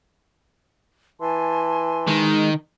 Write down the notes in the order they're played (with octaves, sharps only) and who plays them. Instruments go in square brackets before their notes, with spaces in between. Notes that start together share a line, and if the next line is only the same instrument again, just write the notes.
[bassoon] E3 [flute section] G#5 A5 C6
[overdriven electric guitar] D#3 [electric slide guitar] G#3 D#4